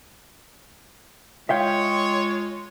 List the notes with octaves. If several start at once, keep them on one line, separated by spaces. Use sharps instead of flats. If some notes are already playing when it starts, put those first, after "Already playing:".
G#3 F4 C#5 E5 F5 G5